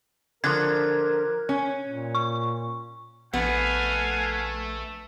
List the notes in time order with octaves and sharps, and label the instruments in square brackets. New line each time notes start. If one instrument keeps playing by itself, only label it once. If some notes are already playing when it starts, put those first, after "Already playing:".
[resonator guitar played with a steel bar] D3 F3 [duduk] A#4 [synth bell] F#6 G#6
[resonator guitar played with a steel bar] C#4
[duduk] A#2
[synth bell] C#6
[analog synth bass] A#1 [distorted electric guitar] A3 [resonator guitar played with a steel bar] B3 [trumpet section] F5 F#5 G#5